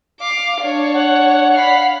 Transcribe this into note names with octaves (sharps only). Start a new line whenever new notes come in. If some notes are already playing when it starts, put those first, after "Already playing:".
F5 D6
D4 C#5
F#5
F5 B5